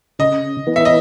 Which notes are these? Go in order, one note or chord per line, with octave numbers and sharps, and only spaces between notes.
C#3 D#5
E3 B3
E5
D#5